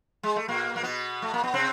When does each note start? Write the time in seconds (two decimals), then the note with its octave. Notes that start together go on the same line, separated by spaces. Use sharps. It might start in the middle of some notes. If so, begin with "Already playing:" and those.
0.23 G#3
0.36 A3
0.48 A#2 A#3
0.76 A#3
0.83 B2 B3
1.22 A3
1.34 A#3
1.43 B3
1.54 C3 C4